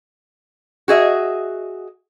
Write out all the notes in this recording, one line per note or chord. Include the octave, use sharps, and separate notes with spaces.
F#4 G#4 D#5 E5